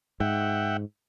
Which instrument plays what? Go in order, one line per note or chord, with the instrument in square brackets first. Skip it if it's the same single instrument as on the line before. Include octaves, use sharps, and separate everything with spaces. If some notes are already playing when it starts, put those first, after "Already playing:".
[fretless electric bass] G#2 [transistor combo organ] E5 F#5 G5